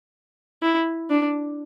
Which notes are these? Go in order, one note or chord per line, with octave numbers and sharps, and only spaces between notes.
E4
D4